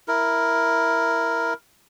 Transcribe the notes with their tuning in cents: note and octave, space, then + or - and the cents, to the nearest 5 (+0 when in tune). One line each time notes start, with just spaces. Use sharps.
E4 +0 A#4 +0